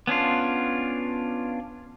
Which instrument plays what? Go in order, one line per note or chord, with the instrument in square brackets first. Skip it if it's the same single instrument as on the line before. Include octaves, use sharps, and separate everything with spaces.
[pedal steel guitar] B3 C#4 D4 F4